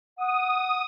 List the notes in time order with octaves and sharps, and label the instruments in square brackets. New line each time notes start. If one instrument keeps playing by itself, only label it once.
[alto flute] F#5 [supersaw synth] D#6